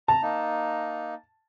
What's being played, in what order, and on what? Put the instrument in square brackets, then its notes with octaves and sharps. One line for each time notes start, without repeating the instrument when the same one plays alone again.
[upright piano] A5 [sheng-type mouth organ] A#5
[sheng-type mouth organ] A#3 D#4